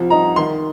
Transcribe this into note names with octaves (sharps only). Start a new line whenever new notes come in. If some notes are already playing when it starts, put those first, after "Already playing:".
Already playing: C2 F3
D#4 A#5
D#3 C6